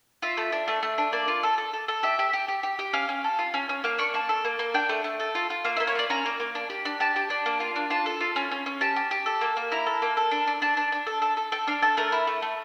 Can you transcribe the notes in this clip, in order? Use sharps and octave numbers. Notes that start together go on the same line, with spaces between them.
F4 E5
A3
D4
A3
A3
D4
A#3 D5
F4
A4
A4
A4
A4
G4 E5
G4
G4
G4
G4
G4
C#4 F5
C#4
A4
F4
C#4
C#4
A#3 F5
D4 C#6
A#3 A5
A4
A#3
A#3
D4 G5
A3
A3
A4
F4
F4
A#3 F5
E5
A#3
C#5
F4 D5
C#4 A#5
A#3
A#3
D4
G4
D4
G4 A5
G4
D4
A#3
F4
D4
F4 A5
A4
F4
C#4
C#4
C#4
G4 A5
G4
G4
A4
A#3
A#3
E4 A#5
A4
A#3
A4
D4
D4
D4 A5
D4
D4
A4
A4
A4
A4 G5
D4 F5
A4 A5
A3 A#4
E4
A3
A3